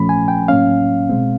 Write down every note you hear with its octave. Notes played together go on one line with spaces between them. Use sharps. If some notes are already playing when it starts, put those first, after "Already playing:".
Already playing: A#2 F3 A3 C#4 B5
G#5
G5
A2 F#3 A#3 C#4 F5
B2 G#3 C4